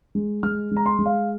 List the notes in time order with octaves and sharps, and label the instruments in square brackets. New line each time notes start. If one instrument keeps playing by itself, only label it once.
[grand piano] G#3
G#3 F6
G#3
A#5
C6
G#3
F5